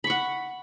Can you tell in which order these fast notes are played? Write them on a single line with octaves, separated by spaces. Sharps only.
B5 C#6 F#5